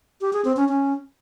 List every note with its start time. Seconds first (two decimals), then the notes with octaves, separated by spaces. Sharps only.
0.21 G4
0.33 G#4
0.45 C4
0.57 C#4
0.69 C#4